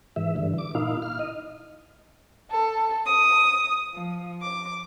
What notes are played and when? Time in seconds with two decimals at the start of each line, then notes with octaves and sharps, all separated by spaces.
0.16 G#2 E3 E5
0.36 G2 D3 E3
0.58 D6
0.75 A#2 D#4 E4 F5
1.02 F6
1.19 D#5
2.50 A4
3.06 D#6
3.92 F3
4.42 D6